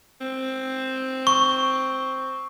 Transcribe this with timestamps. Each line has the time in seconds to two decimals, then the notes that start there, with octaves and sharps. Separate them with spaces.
0.21 C4
1.27 C#6